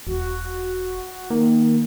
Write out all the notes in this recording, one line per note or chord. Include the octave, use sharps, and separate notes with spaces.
E1 F#4
D#3 A#3